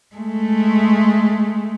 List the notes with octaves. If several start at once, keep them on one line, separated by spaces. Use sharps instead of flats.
G#3 A3